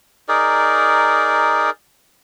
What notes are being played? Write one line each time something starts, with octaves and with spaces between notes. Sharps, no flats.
D#4 G#4 A#4 D5